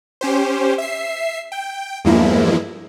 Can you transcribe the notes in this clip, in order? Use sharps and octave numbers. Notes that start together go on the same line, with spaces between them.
C#4 G4 C5
E5 C7
G5
E2 G2 F3 G#3 A#3 E4